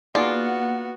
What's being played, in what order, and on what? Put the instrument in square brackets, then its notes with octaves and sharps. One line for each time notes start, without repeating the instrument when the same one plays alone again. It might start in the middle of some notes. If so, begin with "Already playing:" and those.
[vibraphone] A#3 [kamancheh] B3 F#4 [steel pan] D#4 G#4 D5 [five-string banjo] F4